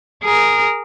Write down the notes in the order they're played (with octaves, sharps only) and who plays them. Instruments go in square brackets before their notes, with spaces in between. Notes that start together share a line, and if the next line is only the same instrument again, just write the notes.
[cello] G#4 A#4